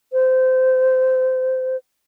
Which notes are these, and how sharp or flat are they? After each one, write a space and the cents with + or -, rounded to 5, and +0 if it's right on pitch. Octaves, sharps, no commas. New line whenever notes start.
C5 -20